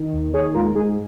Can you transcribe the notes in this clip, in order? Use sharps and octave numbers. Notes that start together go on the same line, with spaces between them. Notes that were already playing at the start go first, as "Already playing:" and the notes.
Already playing: D#3
D#2
D#3 G#4 C#5
G#2 F4 A#4
G#2 D#4 G#4